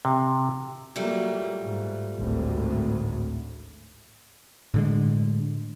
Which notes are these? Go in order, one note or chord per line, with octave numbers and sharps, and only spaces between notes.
C3
A#2 F#3 G3 A3 A#3
G#2
G#1 D2 A2
A2 D3 G#3